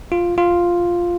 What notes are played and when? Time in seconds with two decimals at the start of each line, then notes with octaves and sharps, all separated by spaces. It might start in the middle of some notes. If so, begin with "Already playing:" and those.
0.12 F4
0.38 F4